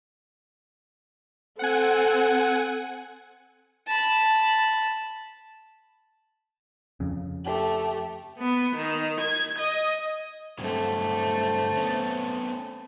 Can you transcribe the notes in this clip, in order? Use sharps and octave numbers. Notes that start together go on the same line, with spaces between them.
C4 A4 F#5 G#5
A5 B5
F2 C#3
A3 G4
B3
D#3
G#6
D#5
G2 D3 F#3 A3 C4
B3 C#4